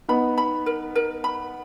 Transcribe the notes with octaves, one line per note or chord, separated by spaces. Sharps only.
B3 D#4 B5
B5
A#4
A#4
B5